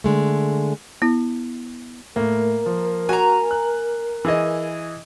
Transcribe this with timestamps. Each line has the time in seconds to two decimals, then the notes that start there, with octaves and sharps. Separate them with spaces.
0.04 D3 G#3 A3
1.02 B3 E4
2.16 A2 A#3 A#4
2.66 F3
3.09 F#4 G#5 A#5
3.51 F#6
4.25 E3 G#4 D#5